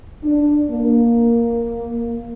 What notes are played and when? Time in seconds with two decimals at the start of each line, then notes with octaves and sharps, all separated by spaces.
0.24 D4
0.70 A#3